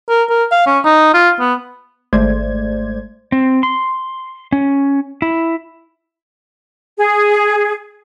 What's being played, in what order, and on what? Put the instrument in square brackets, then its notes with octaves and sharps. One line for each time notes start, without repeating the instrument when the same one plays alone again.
[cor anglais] A#4
A#4
F5
C#4
D#4
F4
B3
[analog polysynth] G#1 G#3 A3 C5 D5 G#6
[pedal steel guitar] C4
C6
C#4
E4
[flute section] G#4